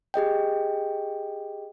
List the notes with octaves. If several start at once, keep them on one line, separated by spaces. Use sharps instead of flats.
G4 G#4 D#5 G5